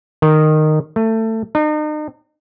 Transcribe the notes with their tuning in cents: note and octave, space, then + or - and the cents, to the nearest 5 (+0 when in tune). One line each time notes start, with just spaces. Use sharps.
D#3 -15
A3 +20
D#4 -40